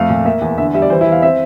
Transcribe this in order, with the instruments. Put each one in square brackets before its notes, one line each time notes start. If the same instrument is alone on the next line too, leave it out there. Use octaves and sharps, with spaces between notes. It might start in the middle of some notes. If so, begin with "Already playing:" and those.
Already playing: [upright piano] F2 A3 F5
A#2
A#3 E5
E2
D3 E5
G3 E5
D5
E3 C5
E4
E2
F5
C4 E5